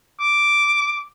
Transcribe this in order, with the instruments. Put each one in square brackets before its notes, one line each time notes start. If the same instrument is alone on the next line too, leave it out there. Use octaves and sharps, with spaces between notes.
[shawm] D6